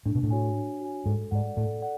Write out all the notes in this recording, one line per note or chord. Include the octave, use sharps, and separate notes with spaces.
A2 D4
B2
A2
F#4 C#5 G#5
D4
F#4 C#5 G#5
G#2 A4
G#2 D5 F#5
A2 A4
D5 F#5